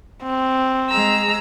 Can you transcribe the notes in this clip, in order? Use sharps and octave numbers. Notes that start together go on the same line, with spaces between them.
C4
G#3 A#5 E6